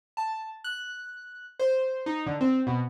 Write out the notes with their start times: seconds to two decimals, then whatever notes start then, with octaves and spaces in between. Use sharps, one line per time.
0.17 A5
0.64 F#6
1.59 C5
2.06 D#4
2.26 D3
2.41 C4
2.67 B2